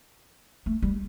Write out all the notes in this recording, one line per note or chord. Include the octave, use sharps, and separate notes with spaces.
A3
G3